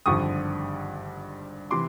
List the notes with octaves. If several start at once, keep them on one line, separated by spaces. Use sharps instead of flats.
G#1 G2 D3 F3 C#6 D#6
C3 E3 C6 D6